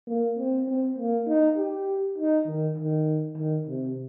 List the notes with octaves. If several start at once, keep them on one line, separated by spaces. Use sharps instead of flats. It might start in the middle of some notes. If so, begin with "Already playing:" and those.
A#3
C4
C4
A#3
D#4
G4
D#4
D#3
D#3
D#3
C3